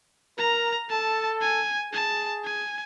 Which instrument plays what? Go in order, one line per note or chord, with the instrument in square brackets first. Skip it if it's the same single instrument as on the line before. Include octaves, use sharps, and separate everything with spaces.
[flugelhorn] A#4 [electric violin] A#5
[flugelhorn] A4 [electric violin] A5
[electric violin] G#5
[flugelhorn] G#4 [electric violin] A5
[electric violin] G#5